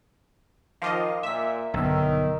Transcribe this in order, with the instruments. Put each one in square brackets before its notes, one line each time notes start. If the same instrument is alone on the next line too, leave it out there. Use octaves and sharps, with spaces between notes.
[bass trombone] D#3 [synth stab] F3 F4 D#5 [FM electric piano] F5 C6 D6
[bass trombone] A#2 [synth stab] E5 B6
[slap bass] B1 [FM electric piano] G2 D3 E6 [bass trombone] D#3